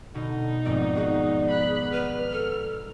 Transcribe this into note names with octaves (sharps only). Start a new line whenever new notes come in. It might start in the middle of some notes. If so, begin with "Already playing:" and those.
B2 D3 D#4
G#1 F2 G#2 B3 C4 D5
F#4 G#4
B5 F#6
B4 F6
A4